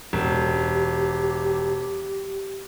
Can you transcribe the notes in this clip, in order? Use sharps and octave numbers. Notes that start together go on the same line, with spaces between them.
E1 G4